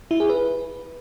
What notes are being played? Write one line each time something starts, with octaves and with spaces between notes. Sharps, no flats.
E4
G#4
B4